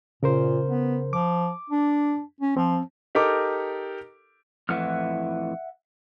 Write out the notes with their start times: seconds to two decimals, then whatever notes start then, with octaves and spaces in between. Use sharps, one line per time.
0.23 A#2 C#3 A#4 C5
0.68 B3
1.13 F3 D6
1.70 D4
2.41 C#4
2.57 F3 C4
3.15 D#4 G4 A4 A#4 D6
4.69 F2 A2 E3 E5 F#5 F6